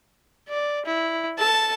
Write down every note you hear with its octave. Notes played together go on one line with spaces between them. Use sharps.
D5
E4
A4 A5